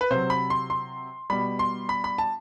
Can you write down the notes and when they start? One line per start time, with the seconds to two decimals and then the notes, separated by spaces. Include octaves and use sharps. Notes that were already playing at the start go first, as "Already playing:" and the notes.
0.01 B4
0.11 C3 F#3 C5
0.30 B5
0.50 C6
0.70 C6
1.30 B2 G3 B5
1.59 C6
1.89 B5
2.04 B5
2.18 A5